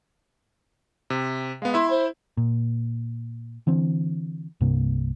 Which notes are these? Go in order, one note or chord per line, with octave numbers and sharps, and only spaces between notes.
C3
G#3 B3 F5
E4 E5 C6
C5
A#2
D3 E3 C4
C2 G2 C3 A#3